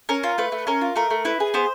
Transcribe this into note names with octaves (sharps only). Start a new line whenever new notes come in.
C#4 A#4
F4
A3 B4
A3
C#4 A#4
F4
A3 A#4
A3
E4 B4
G#4
B3 C5